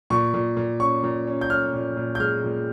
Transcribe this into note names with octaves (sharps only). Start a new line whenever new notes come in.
A#2 C#6
A#2
A#2
C#4 C#6
A#2
C#4
G6
C#4 F6
A#2
A#2
G6
G#3 F6
A#2